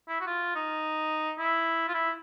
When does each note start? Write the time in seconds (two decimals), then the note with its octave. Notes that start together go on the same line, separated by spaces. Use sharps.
0.08 E4
0.21 F#4
0.27 F4
0.55 D#4
1.39 E4
1.88 F4
1.94 E4